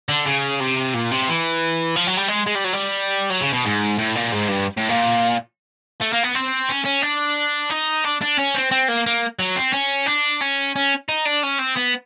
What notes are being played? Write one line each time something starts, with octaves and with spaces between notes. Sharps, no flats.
D3
C#3
C3
A#2
C3
E3
F3
F#3
G3
G#3
G#3
G3
F#3
G3
F#3
C#3
B2
G#2
A2
A#2
G#2
G2
A2
A#2
A3
A#3
B3
C4
C#4
C#4
D4
D#4
D4
D4
C#4
C4
C4
A#3
A#3
F#3
C4
C#4
D4
C#4
C#4
D#4
D4
C#4
C4
B3